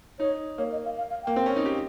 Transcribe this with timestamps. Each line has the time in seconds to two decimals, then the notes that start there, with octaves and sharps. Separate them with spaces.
0.19 D#4 C#5
0.58 A#3 C#5
0.72 D#5
0.85 F5
0.98 F5
1.10 F5
1.23 A#3 G5
1.36 C4
1.46 C#4
1.56 D#4
1.66 G4